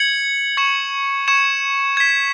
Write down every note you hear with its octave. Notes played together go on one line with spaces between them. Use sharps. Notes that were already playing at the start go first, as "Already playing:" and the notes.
Already playing: G#6 C#7 F#7
C#6 G#6 C#7 E7
C#6 G#6 C#7 E7
G#6 B6 E7